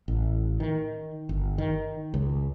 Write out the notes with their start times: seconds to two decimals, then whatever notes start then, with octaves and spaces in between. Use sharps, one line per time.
0.08 A1
0.60 D#3
1.29 G1
1.58 D#3
2.14 C#2